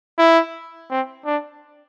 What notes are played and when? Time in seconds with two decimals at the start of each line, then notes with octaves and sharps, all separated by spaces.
0.18 E4
0.90 C4
1.26 D4